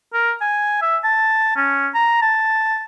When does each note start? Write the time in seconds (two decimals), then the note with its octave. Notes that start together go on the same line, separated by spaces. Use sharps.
0.13 A#4
0.41 G#5
0.82 E5
1.04 A5
1.56 C#4
1.95 A#5
2.22 A5